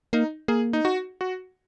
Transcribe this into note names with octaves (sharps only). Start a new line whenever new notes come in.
A#3 D#4
A#3 G#4
D#4
F#4
F#4